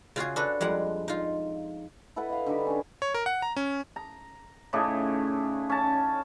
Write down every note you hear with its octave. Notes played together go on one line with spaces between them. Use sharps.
C#3 F4 F#4 G#4
D4 F#4 A4 B4
F2 G3 G#3 F#5
D#4 F4
E4 A4 B4 F#5
D#5 F5
D3 G3 D#4 G4
C#4 C#5
C#5
A#4
F#5
A#5
C#4
A#5
A2 C#3 D4 D#4
C#4 A5